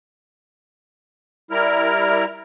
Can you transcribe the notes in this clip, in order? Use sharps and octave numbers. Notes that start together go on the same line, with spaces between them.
G3 E4 A#4 F6